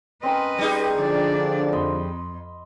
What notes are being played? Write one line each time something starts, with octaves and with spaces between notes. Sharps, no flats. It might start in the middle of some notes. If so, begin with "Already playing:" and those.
C4 C#4 A#4 B4 D#5
G3 D#4 G#4
D3 F3 D4 D5
F2 D#5 B5 C6